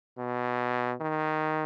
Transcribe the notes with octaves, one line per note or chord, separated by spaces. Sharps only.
B2
D#3